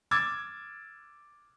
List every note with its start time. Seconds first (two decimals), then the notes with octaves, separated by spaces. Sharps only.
0.11 D6 E6 G#6 A6